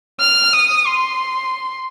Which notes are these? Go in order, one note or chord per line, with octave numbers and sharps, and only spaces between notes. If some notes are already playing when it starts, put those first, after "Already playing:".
F6
D#6
C6